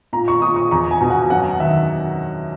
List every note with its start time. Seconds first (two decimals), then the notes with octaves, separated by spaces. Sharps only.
0.13 A#2 A#5
0.28 C#6
0.41 A#2 D#6
0.56 C#6
0.71 E2 A#5
0.91 G#5
1.01 B2
1.10 F#5
1.30 F#2 F#5
1.60 D#3 E5